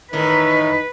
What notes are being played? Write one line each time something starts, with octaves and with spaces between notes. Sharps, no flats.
A2 D#3 E3 D#4 B4